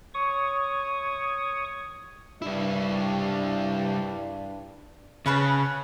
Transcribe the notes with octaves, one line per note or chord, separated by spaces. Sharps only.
C#5 C#6 D#6
G2 G3 D4 E4
C#3 C#4 B4 A5